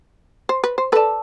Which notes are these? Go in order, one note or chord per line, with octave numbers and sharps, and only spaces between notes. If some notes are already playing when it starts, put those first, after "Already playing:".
C5
B4
C5
A4 B4 D5 A5